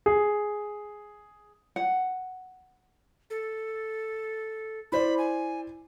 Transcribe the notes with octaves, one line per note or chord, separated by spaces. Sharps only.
G#4
F#5
A4
E4 C5 D5 B5
G#5